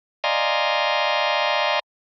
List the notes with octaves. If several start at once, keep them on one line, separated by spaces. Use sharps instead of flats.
D5 D#5 F5 G#5 A#5 C6